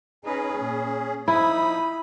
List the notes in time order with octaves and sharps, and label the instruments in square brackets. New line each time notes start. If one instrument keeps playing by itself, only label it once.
[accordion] C#4 G#4 [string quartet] D#4 B4
[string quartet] A#2
[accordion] F3 D#4 D#6 [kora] E4 [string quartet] B5